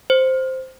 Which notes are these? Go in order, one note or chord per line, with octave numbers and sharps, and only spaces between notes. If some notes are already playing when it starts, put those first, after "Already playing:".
C5